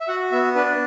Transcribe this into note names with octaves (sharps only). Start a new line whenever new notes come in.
E5
F#4 F#5
B3 E5
D4 B4